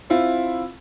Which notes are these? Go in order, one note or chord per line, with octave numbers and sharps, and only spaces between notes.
C4 E4 F4